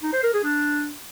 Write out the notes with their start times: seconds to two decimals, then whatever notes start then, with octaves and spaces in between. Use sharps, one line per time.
0.03 D#4
0.13 C5
0.23 A#4
0.34 G#4
0.44 D4